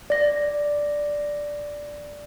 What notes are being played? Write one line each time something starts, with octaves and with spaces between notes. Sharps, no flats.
D5 A#6